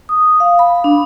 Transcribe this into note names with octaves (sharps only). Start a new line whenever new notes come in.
D#6
F5
B5
D4